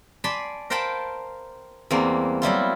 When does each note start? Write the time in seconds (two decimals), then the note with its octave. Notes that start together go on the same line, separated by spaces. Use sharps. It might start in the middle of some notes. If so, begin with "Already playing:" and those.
0.24 D5 G#5 A5 B5 C6
0.70 A#4 C5 F5 G5 A5 B5
1.91 E2 G3 A#3 C4
2.42 F#3 G3 E4 F4